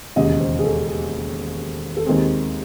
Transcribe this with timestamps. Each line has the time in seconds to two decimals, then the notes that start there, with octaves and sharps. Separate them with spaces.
0.16 E1 D#2 C#3 D#5
0.40 C5
0.59 G#4
0.64 A4
0.88 G#4
1.97 A4
2.06 D#2 D#3 G#3 C4 G#4